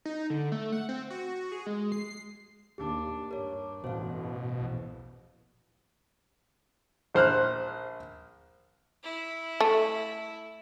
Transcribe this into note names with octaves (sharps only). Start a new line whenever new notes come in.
D#4
D3
A3
F#5
C4
F#4
G#4
G#3
C7
D#2 D4 G4
G2 D4 A#4 C#5
A1 B2 C5 F5
A#1 E2
A#1 C5 F6 F#6
E4
A3